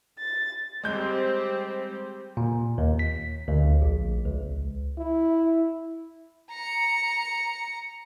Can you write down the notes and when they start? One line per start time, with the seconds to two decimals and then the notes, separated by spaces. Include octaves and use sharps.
0.18 A6
0.83 G3 G#3 C4 G4 G6
2.37 A#2
2.78 D#2
2.99 B6
3.48 D2
3.82 A#1
4.25 C#2
4.98 E4
6.50 A#5 C#7